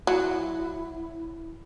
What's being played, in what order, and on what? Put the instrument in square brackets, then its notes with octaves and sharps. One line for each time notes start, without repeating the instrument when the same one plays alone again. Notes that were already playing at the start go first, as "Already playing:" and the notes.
[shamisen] F#3 [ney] E4